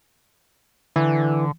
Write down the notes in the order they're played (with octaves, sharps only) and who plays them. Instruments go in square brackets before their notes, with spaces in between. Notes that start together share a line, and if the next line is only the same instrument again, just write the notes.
[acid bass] D3 [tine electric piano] E3